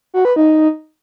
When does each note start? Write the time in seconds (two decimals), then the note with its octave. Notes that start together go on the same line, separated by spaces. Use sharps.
0.14 F#4
0.25 B4
0.36 D#4